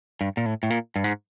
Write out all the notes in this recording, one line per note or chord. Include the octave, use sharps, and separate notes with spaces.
G2
A#2
A2
A2
A#2
G2
G#2